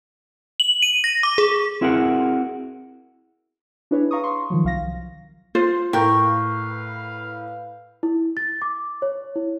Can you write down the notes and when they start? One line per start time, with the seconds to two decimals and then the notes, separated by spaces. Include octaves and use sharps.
0.60 F#7
0.83 D#7
1.04 A#6
1.23 D6
1.38 G#4
1.81 C4 E4 F#4 G#4 A#4 F#5
3.91 D4 E4 G#4 B4 C#5
4.11 F5 A#5 C#6 D#6
4.23 C6 C#6
4.50 D#3 F3 F#3
4.64 C2 F5 A#6
5.55 F4 C5
5.93 A2 A#4 B4 F5 G5 C#6 G6
8.03 E4
8.37 A6
8.62 D6
9.02 C#5
9.36 E4